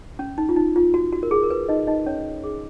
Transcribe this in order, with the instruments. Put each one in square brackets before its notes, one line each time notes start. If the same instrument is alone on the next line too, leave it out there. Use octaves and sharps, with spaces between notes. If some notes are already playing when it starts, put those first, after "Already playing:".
[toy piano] C#4
D#4
F4
D#4
F4
F#4
F#4
A#4
G#4
A#4
B4
D#4 D#5
D#4 D#5
C#4 C#5
G#4